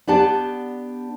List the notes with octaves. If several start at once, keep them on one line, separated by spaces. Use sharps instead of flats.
B3 D4 G4 D5 F#5 A5